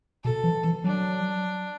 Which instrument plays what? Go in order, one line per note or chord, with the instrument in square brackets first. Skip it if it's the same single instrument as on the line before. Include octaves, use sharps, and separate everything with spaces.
[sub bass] B2 [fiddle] A4
[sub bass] E3
E3
[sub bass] F#3 [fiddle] D4